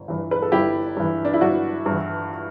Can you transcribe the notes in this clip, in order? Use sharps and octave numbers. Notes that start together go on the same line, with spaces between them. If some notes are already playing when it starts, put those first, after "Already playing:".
Already playing: G1
G2 E3
B4
A4
G1 E4 G4
G2 E3
D4
E4
G1 D4 F#4
G2
E3